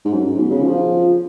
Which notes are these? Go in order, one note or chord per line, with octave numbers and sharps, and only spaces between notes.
G#2
F#2
G#2
B2
C#3
F3